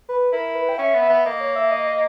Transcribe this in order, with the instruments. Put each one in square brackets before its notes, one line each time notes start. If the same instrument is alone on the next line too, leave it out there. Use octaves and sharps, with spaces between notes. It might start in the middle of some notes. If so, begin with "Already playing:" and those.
[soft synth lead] B4
[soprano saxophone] E4 [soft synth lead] A#4
[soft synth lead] B4
G5
[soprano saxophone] C#4 [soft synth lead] E5
[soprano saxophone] B3
[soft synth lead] E5
[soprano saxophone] B3
[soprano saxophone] A#3 [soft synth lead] D#5
[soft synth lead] C#5
E5
D#5
D#5